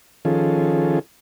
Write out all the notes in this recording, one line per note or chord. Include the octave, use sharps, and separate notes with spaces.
D#3 F3 C#4 F4 G#4 A4